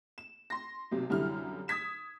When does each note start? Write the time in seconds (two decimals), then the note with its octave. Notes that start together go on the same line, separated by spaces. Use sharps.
0.18 E7
0.50 C6 A#6
0.91 B1 C3 F#3
1.10 C2 F#2 D3 G3 E4 F6
1.68 D#6 G#6 B6 E7